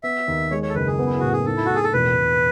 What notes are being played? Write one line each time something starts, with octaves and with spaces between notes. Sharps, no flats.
B3 E5
D#2
G#3 C#5
C#5
A4
F#1 B4
G#4
B3
E4
A2 F#4
G#4
D#4 A4
E4
A2 F#4
G#4
A4
E1 B4
E1